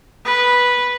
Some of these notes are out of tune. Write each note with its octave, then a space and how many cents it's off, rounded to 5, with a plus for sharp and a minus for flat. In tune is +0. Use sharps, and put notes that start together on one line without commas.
B4 -10